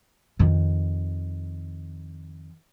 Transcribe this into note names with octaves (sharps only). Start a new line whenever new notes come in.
F2 D#3